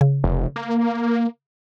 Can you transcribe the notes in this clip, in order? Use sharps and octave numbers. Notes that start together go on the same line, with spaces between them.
C#3
F1
A#3